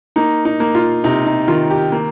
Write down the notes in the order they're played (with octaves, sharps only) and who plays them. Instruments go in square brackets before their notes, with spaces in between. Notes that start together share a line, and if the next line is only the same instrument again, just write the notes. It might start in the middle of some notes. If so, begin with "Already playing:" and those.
[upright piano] A#3 D#4
D#4
A#3
F4
C3 D#4
D#4
D#3 F4
G4
A#3